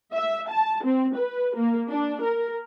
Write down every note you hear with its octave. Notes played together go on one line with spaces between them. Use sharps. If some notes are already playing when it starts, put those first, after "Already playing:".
E5
A5
C4
B4
A#3
D4
A#4